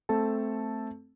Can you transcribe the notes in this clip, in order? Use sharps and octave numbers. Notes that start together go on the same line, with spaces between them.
A3 C4 A4 A5